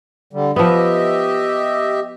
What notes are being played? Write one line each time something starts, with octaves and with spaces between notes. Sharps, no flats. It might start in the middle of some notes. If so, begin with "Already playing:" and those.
D3 G3
F3 B3 G4 D#5 E5